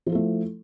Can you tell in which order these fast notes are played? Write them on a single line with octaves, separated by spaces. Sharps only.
F3 E4 A4 A3